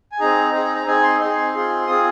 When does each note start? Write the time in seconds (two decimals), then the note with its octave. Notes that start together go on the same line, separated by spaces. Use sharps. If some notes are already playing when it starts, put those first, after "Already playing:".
0.12 G#5
0.19 C4 D#4 G#4 A#5
0.53 C4 D#4 G#4
0.75 A#5
0.86 C4 D#4 G#4 G#5
1.03 C6
1.20 C4 D#4 G#4 C6
1.54 C4 F4 G#4
1.87 C4 F4 G#4 D#6